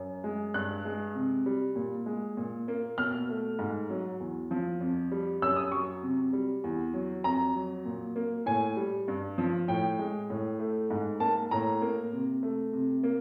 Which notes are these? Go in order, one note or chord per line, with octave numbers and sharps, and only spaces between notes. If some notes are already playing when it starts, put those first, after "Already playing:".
Already playing: F#2
G#3
G2 F#6
G#3
C3
G3
A#2
G#3
A#2
A#3
B2 F6
A3
G#2
F#3
E2
F3
F2
G3
F#2 E6
D#6
F#3 C#6
C3
G3
E2
F#3
F2 A#5
F#3
A#2
A#3
A2 G#5
G3
G2
F3
A2 G5
G#3
A2
A3
G#2
A#3 A5
A2 A#5
A#3
C3
A3
C3
A#3